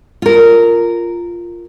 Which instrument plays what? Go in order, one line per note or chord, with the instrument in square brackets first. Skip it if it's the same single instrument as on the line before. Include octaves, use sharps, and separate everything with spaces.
[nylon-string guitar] F4 A#4